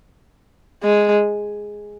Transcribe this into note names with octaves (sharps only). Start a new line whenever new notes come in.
G#3